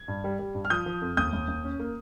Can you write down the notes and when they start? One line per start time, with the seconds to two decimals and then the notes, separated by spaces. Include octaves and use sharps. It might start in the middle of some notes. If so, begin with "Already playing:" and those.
Already playing: G#6
0.08 G2
0.24 G3
0.39 G3
0.55 G2
0.65 F6
0.70 F3 D#6 G6
0.86 F3
1.01 F2
1.17 D#2 D#6 G6
1.33 D#2
1.48 D#2
1.64 C#4
1.79 A#3